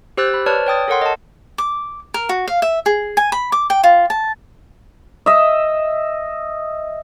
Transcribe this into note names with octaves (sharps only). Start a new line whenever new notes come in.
G4 C5 E6 F#6 A6
C5 B5
B4 C#5 D5 A5 F6
C#5 G5 D#6 A6
A4 A#4 C#5 F#5 C6
D#5 A5
D6
A#4
F#4
F5
E5
G#4
G#5
B5
D6
G5
F4
A5
D#5 E5